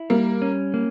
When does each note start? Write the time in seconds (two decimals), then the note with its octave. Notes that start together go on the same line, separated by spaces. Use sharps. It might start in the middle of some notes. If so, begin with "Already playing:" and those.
Already playing: E4
0.10 G3 A#3
0.42 C#4
0.74 A#3